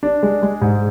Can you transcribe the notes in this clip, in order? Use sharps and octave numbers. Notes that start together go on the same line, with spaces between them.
D4
G#3
G#3
G#2